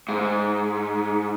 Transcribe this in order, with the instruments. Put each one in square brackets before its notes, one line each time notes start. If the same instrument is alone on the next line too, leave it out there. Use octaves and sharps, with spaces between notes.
[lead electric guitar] G#2